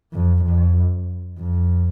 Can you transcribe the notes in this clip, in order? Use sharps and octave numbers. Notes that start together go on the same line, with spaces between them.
F2
F2
F2